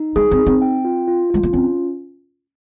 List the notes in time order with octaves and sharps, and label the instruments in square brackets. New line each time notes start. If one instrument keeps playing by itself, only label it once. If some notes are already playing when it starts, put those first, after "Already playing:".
Already playing: [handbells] D#4
[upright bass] G#3 [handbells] G#4
[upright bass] C4
[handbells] D#4
[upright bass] C4
[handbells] G5
F4
F4
[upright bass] G#3 [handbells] F4
[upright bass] A#3
[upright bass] C4 [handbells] C#4